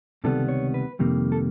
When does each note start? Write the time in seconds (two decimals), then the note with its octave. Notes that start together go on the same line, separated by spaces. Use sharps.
0.24 C#2 C3 D#3 G3 B3 A4
0.49 C#5
0.74 B4
0.99 F2 C3 D#3 G3 A#3
1.32 A4